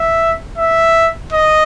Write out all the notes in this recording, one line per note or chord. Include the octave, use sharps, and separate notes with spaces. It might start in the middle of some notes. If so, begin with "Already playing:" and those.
Already playing: E5
E5
D#5